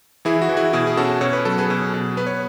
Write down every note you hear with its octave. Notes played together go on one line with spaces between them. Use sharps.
E3 E4 G#4
F#4
E3
E4 G#4
B2 E4 G#4
G#4
C#4 F#4 A4
B2 C#5
B4
F#3 A4
G#4 B4
B2
B2
B3 B4
C#5